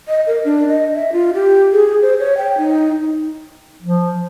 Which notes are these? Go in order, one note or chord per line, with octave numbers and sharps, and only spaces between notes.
D#5
A#4
D4
D#5
E5
F4
G4
G#4
C5
C#5
G5
D#4
F3